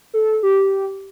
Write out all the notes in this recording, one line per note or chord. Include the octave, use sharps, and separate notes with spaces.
A4
G4